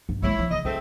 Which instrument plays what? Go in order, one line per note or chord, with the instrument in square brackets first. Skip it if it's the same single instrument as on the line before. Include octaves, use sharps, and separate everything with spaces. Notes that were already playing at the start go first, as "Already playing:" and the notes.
[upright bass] G2
[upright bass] D#3 G#3 [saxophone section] E4 C#5
[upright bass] F3
[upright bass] C#3 [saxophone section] D#5
[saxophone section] G#3 A3 C4 [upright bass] F4